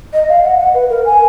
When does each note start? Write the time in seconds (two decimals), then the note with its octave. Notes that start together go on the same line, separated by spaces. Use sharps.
0.13 D#5
0.29 F5
0.44 F#5
0.58 F#5
0.74 B4
0.90 A#4
1.05 G#5